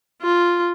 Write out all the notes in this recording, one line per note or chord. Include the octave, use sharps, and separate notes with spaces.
F4